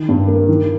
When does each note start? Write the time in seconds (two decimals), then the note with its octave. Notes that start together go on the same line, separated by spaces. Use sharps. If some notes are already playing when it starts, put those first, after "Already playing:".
Already playing: D#3
0.09 G2
0.28 A#3
0.48 D#3